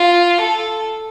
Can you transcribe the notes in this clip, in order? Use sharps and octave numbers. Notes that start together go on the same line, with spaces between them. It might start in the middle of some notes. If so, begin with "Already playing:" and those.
Already playing: F4
A4